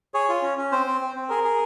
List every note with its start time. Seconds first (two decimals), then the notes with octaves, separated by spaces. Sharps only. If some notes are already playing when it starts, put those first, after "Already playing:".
0.14 G#4 C#5
0.29 F4
0.42 C#4
0.57 C#4
0.72 C4 C5
0.87 C4
1.01 C4
1.15 C4
1.29 G#4 A#4
1.44 G#4